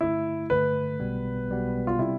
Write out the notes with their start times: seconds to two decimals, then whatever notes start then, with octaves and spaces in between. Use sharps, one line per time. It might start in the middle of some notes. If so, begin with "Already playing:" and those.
0.01 G2 D3 A3 E4
0.50 G2 D3 A3 B4
1.00 B1 B2 G3 B3
1.48 B1 B2 G3 B3
1.87 F4
1.99 C3 G3 C4 E4